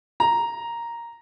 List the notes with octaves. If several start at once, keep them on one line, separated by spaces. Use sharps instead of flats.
A#5